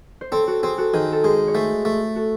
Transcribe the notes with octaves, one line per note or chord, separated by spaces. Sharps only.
C5
C4 A4 C#5
F#4 A4
C4 G#4 C5
F#4 A4
D#3 G#4 C5
A4
G#3 G#4 C5
C#5
A3 G#4 C5
A3
F#4 A4